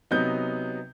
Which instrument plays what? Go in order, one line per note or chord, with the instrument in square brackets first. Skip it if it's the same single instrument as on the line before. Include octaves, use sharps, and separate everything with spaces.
[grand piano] C3 F#3 B3 D#4 G6